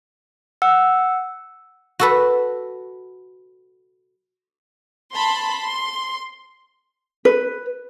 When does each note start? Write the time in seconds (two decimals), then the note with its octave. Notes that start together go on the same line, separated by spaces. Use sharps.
0.62 F#5 E6
1.99 F#4 A4 B4
5.14 A5 B5 C6
5.59 C6
7.25 B4